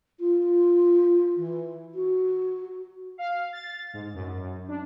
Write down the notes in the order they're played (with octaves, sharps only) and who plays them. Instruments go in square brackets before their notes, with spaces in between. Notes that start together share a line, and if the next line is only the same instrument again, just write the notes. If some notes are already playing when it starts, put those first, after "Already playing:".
[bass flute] F4
E3
F#4
[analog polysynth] F5
A6
G#2
F#2
D4